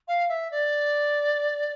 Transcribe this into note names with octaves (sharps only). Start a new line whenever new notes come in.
F5
E5
D5